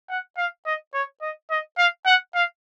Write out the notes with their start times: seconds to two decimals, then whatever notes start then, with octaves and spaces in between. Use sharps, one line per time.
0.10 F#5
0.38 F5
0.66 D#5
0.94 C#5
1.22 D#5
1.50 D#5
1.78 F5
2.06 F#5
2.35 F5